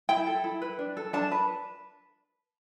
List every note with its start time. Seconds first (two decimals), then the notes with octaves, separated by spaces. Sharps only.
0.09 E4 G5
0.26 A4
0.44 E4
0.62 B4
0.79 D4
0.97 A4
1.13 D4 A5
1.31 B4